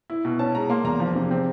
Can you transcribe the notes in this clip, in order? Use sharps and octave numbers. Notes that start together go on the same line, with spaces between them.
E4
B2
C#4 A5
G#3 A#5
A#3 C6
E2 A#5
F3
C3
C4